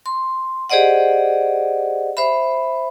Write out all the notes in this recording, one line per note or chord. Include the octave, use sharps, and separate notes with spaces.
C6
G4 G#4 C5 D5 D#5 F#5
C5 E5 B5